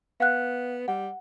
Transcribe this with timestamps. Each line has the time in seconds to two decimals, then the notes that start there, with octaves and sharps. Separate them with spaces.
0.20 B3 F5 F#5 F#6
0.88 G3 F#5